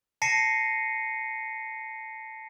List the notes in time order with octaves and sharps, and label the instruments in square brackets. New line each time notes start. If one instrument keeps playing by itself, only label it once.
[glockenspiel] A5 A#6 C7 C#7 D#7